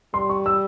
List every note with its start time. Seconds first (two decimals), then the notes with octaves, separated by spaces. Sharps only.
0.14 G3 C6
0.29 C#6
0.46 E6